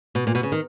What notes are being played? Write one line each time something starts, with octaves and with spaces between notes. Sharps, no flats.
B2
A#2
B2
C#3
D#3